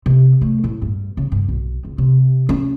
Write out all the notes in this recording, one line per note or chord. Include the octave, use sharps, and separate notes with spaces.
C3
A3
A2
G2
C#3
G2
B1
C#2
C3
C#4